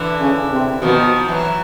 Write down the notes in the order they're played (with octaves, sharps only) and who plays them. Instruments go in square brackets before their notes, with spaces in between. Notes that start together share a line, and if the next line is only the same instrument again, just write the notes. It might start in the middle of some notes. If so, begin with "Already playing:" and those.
Already playing: [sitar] D3 E3
[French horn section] C#3
C3
[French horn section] B2 [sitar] D#3 F3
[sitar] E3 F#3